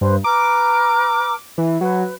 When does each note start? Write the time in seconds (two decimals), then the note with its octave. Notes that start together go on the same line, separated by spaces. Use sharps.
0.01 G2 B4 C5 C6
0.24 B4 A#5 D6 F6
1.58 E3
1.81 F#3 B4